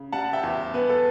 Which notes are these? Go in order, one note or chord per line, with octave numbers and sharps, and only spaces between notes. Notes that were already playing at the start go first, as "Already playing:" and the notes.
Already playing: C#3
G3 F#5 A5
E5 G5
E2
B3 B4
A4